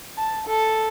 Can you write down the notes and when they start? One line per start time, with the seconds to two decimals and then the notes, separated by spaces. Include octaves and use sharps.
0.18 A5
0.48 A4